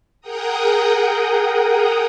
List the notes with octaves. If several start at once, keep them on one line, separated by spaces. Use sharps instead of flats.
G#4 A#4 F#5 G5 A#5 D#6